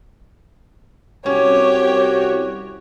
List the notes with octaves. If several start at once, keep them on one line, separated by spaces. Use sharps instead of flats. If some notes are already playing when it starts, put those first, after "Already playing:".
C2 C#4 F#4 G4 C#5